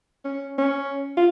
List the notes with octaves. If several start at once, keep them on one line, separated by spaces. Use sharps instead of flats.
C#4
C#4
F4